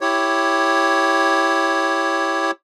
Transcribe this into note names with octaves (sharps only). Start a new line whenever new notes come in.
E4 G4 C#5